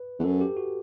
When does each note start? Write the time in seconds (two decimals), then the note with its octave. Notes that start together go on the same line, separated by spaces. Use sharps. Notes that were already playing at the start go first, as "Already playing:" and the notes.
Already playing: B4
0.19 E2
0.24 F#2 A4
0.41 G4
0.57 F#4